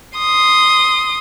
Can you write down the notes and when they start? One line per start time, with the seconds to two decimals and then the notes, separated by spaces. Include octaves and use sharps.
0.18 C6 D#6